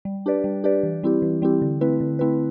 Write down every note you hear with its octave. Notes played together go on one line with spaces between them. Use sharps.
G3
D4 G4 B4 D5
G3
D4 G4 B4 D5
E3
G3 C4 E4 G4
E3
G3 C4 E4 G4
D3
A3 C4 E4 B4
D3
A3 C4 E4 B4